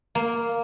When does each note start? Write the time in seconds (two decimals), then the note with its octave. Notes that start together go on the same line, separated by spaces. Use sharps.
0.15 A#3